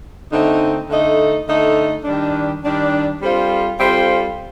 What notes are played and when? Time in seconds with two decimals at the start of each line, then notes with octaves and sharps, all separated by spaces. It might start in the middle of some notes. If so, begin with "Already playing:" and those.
0.30 D3 A3 C4 D#4
0.88 D3 A3 D#4 A4 D#5
1.47 D3 A3 D#4 A4 D#5
2.04 D#3 G3 D4
2.63 D#3 G3 D4
3.21 G3 C4 F4 A4 C5
3.79 G3 C4 F4 A4 C5